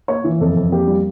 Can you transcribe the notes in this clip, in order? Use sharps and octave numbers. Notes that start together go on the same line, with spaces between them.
A#3 C#5
E3
F2 A4
F2
A#3 G4
G3